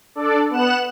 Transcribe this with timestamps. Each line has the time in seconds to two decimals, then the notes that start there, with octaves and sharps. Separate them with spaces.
0.15 D4 A4 D5
0.50 B3 F#5 F#6 E7